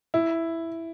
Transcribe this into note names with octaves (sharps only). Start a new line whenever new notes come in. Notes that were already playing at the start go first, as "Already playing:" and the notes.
E4